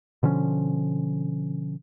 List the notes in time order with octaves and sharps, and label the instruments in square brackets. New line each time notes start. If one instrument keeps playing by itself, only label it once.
[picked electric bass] B2 D3 F3 C#4